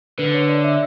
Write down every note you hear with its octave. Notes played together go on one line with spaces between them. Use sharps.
D3 B4
C#5
D5
E5